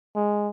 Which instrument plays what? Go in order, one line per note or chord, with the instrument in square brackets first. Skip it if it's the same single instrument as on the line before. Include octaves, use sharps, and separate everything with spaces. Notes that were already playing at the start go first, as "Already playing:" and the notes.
[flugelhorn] G#3